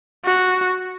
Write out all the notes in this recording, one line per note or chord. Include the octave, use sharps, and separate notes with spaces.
F#4